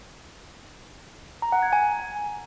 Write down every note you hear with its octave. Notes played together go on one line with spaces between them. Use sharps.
A#5
F#5
G#6
G#5